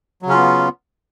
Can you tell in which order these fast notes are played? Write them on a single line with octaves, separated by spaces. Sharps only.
F#3 C#3 C#4 F4 B3